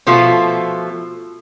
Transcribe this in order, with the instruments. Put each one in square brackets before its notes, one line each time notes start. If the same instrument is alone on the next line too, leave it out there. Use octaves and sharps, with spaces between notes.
[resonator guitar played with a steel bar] B2 F3 A3 F4